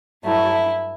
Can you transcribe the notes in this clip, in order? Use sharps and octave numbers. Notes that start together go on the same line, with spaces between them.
G2 F#3 A3 E4